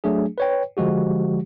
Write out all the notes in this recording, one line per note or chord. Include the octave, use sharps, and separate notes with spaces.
F#3 A3 D4 G#4
B4 C#5 G5
D3 F3 G#3 F#4 G4